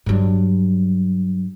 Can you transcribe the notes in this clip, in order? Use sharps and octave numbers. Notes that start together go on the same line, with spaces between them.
G2 F#3